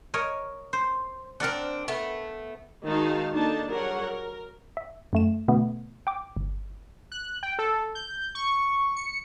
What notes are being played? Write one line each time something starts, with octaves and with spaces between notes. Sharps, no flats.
A#4 C#5 D#5
C5
C4 D4 A#4 D5 F#5
A3 B3
D#3 G#3 D#4 F#4 F5 A5
A#3 D4 D#4 A4 A5
F#3 G3 G#4 A#4 C#5 F#5
A#4
E5
F#2 A3 E7
B2 D3 A3 B3
G5 D6
G1
F#6
G5
A4
G6
C#6
C#7